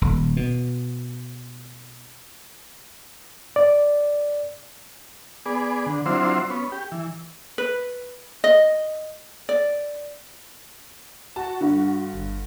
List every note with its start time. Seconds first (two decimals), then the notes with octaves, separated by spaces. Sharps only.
0.01 D#1
0.37 B2
3.56 D5
5.46 B3 G#4 D5
5.86 D3
6.06 F#3 C4 D4 E4 F4 C5
6.50 B3 C#4
6.72 G4
6.92 E3
7.58 B4
8.44 D#5
9.49 D5
11.36 F#4 A5
11.61 G2 D3
12.13 G1